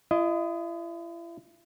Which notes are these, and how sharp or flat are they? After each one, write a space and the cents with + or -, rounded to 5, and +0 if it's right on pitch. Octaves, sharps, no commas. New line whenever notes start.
E4 +40 D#5 +0